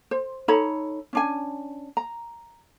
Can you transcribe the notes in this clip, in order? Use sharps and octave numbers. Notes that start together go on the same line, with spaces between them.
C5
D#4 A4 C#5 B5
C#4 D4 G#5
A#5